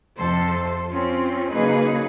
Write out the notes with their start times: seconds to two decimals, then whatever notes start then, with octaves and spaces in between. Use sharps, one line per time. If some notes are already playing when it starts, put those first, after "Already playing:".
0.17 F2 C3 A4 C5
0.89 C4 C#4 F4
1.51 C#3 F#3 A#3 D#4 G#4 B4